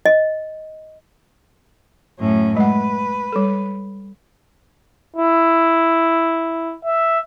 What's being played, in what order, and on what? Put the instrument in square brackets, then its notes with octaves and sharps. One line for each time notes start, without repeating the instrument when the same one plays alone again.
[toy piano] D#5
[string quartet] F#2 A2 C#4
[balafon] G#3 F#5 [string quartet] B4
[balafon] G3 A4
[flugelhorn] E4
E5